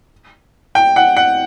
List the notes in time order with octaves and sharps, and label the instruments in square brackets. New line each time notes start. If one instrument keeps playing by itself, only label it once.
[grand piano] G5
F#5
F#5